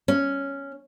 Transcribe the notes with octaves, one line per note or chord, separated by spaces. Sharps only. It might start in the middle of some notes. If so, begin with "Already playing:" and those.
C#4